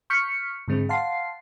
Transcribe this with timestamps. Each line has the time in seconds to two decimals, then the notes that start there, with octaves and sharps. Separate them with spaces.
0.10 C#6 F6 G6 B6 C#7
0.68 G#2 D3 G#3 C4
0.89 F5 F#5 A5 C6 C7